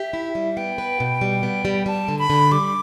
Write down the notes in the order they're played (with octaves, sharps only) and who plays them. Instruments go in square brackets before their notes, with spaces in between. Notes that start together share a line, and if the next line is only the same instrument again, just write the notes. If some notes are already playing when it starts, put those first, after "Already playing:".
Already playing: [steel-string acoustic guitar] G4 [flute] E5
[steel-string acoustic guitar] E4
G3
[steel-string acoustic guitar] B3 [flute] G5
[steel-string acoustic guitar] B4
B2
G3
B3
G3
[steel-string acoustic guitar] G3 [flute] A5
[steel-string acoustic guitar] D3
[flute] B5
[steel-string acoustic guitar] D3
[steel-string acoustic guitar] G3 [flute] D6